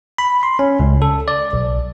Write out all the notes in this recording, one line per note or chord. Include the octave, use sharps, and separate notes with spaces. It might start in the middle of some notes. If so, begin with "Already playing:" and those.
B5
C6
C#4
C#2
A4
D5
B1